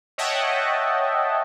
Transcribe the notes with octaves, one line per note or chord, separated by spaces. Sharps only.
C#5 D#5 E5 F#5 G5 A5